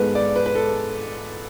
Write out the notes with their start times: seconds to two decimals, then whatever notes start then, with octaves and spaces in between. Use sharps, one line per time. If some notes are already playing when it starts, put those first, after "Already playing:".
Already playing: G#2 G#3 B3 A4 B4
0.15 D5
0.36 B4
0.46 B4
0.55 A4